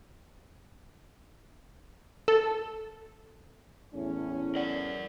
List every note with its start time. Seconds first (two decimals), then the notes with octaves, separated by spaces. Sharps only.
2.28 A4
3.94 E2 A2 C#4
4.55 A#4 D5 F#5